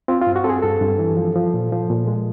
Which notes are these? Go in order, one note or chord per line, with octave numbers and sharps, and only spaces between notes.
C4 F4
F4
G2
F#4
C4 A4
G#4
G2 A4
G2
E3
F3
F3
A#2
F3
A#2
G#3